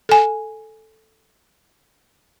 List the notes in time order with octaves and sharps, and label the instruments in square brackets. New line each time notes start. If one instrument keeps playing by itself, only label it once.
[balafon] A4 G#5